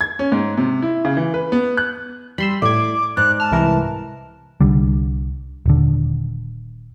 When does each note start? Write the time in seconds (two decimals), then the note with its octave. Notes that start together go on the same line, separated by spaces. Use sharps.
0.01 G#6
0.19 C#4
0.32 G#2
0.57 C3
0.82 E4
1.05 C#3
1.17 E3
1.34 B4
1.52 B3
1.77 F#6
2.38 G3 B5 C6 E6
2.62 A2 D5 D6 G#6
3.17 G#2 D5 F#6
3.40 A5 F6
3.52 C2 E3 A#4
4.61 C2 D3 G3
5.66 D#1 D3